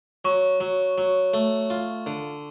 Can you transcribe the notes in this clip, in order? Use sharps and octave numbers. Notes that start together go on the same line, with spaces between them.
F#3 C#6
F#3
F#3
A3
F4
D3